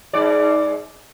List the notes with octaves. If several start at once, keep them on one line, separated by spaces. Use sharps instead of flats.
G#2 D5